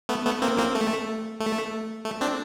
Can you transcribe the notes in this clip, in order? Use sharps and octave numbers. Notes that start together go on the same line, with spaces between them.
A3 B3
A3 B3
A#3 C4
A#3 C4
A3
A3
A3
C4 D4